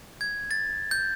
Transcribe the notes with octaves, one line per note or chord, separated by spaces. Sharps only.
G#6
A6
G6